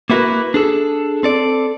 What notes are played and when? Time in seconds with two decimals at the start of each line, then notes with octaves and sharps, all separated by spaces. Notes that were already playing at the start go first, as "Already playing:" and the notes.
0.10 A#3 B3 E4 F#4 A#4 B4
0.54 D4 G#4 A4
1.23 C4 A4 D5